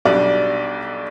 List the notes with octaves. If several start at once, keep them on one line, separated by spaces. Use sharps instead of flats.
B1 B2 G3 D4 D5